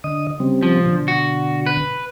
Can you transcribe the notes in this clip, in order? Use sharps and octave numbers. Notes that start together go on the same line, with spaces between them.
D3 D#5 D#6
C#3 G3 C4
F3
B2 D3
F#4
B4